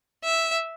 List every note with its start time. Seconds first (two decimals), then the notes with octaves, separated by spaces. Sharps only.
0.25 E5